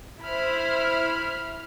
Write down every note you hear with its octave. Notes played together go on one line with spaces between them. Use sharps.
E4 C5 B5 F6